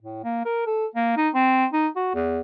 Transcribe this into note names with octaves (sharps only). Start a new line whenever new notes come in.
A2
A#3
A#4
A4
A#3
D#4
C4
D#4
F#4
E2